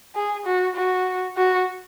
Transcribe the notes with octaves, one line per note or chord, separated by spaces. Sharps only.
G#4
F#4
F#4
F#4